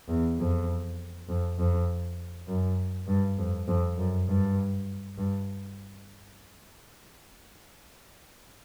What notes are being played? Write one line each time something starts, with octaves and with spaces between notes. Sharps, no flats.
E2
F2
F2
F2
F#2
G2
F2
F2
F#2
G2
G2